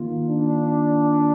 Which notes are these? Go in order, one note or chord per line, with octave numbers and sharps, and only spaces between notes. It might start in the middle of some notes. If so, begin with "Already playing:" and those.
Already playing: D#3 A#3 F4
D4